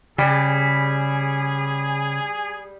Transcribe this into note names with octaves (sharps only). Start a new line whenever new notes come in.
C#3 G3 G#4 G#5